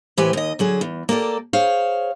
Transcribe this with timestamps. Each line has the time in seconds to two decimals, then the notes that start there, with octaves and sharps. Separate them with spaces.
0.17 A2 E3 G4 B4 C5 G#5
0.33 D#2 D#5
0.59 D3 F#3 G#4
0.81 E2
1.09 A#3 G4 A4 D5
1.53 G#4 C5 C#5 F5